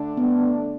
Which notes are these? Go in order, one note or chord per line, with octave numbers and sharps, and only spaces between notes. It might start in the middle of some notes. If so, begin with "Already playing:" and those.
Already playing: D3 A3 D4
B3